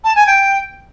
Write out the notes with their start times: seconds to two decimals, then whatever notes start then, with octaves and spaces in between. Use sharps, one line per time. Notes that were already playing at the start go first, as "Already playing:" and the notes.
0.04 A5
0.16 G#5
0.27 G5